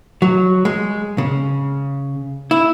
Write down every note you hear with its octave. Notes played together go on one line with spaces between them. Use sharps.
F#3
G#3
C#3
E4